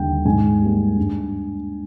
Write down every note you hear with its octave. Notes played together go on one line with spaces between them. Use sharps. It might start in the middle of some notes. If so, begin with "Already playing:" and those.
Already playing: D#2 D3 G3 G5
G#2 G#5
G3 A#3
G2